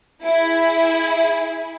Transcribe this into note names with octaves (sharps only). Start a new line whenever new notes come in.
E4 G#4